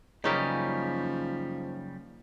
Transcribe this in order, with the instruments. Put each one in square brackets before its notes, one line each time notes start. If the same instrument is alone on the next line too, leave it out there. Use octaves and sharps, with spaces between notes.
[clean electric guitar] F#2 C#3 G3 [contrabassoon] F3 [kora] A#3 C#4 D#4